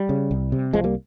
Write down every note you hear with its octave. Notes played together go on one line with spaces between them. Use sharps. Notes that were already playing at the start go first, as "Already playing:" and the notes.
Already playing: G3
C#3
C2
C3
C2 F3 G#3
G3 A#3